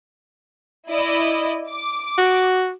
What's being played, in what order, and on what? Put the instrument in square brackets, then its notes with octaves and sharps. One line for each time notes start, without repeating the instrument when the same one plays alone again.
[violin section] E4 D5 D#5
D6
[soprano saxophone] F#4